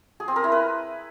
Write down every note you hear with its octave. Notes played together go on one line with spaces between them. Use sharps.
G#4
C4
A#4
E4
B4